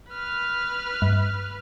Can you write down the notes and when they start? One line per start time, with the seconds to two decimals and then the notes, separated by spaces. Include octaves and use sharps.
0.10 B4 F6
1.02 G2